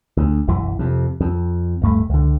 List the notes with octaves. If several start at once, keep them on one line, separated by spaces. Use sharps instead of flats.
D2
E1 B1 F#2 E3
F2 C3
F2
D1 G2 A3
C#2 D3